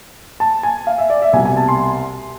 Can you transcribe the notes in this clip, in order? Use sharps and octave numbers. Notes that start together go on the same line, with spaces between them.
A5
G#5
F5
E5
D5
E5
C2 B2 G#5
G#5
A5
C6